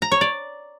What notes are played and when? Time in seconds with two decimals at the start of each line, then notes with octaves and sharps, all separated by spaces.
0.02 A#5
0.12 C#5
0.21 D5